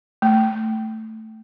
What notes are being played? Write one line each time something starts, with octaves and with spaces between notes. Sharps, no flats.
A3